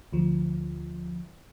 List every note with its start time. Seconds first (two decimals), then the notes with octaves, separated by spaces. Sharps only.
0.13 D2 F3